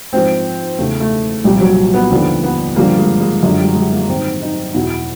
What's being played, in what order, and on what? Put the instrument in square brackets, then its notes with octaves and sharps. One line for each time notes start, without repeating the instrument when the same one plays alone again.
[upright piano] G#2 F3 C4
E2 C#3 E3 A3
A3
C2 A#2 F3 G3
F#3
B3
D#2 D3 F3 B3
B3
G2 D3 F3 A#3
G#3
G#3
F#2 D3 F3 G#3
G3
G#3
A#3
G#2 D#3 C4
D#4
E2 B2 E4